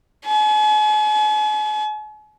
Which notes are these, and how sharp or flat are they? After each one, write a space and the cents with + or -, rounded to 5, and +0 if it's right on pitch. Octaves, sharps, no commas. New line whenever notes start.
G#5 +45